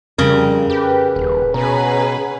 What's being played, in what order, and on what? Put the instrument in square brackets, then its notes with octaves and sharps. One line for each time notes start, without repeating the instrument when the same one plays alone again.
[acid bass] F2 [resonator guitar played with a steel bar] C#3 A#4 [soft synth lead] G3
[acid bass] G4 [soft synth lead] B4
[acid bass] D#1
[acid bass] B2 [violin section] C#4 G#4 B4 [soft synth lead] A#5